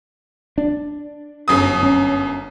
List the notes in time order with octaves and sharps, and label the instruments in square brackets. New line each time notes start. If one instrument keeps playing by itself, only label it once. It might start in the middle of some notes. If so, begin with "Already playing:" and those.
[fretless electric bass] D4
[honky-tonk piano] G1 F#2 D#6
[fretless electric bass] C#4